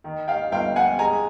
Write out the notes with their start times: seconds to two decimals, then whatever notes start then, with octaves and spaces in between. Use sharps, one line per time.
0.04 D#3
0.28 F5 G5
0.52 G1 F5 G5
0.76 F#5 G#5
0.99 G#3 G#5 A#5